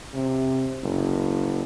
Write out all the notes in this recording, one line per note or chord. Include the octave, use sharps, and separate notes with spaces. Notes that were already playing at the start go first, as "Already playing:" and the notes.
C3
F#1